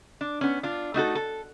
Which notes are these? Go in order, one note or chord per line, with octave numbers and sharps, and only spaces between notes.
D4
B3 C#4
D4 F4
A3 D#4 F#4 A4
A4